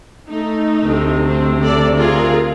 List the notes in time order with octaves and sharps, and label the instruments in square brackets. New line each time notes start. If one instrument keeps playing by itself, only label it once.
[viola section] A3 D#4
[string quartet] D2 C3
[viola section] C4
A4 D5
F4 G#4 A#4